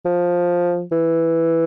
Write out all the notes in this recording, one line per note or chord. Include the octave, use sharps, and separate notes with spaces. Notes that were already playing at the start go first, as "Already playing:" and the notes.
F3
E3